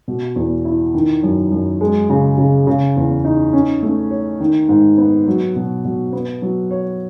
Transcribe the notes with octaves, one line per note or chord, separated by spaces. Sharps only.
B2
E2
E4
D#3
F#2
F#2
G#3
C#3
C#3
C#3
E2
D#4
C#4
A3
C#5
D#3
G#2
B3
F#3
B2
B2
B3
F#3
C#5